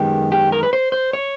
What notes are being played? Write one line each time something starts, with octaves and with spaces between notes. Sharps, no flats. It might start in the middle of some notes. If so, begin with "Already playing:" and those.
Already playing: F#2 D#3 G#3 B3 G4
G4
A#4
B4
C5
C5
C#5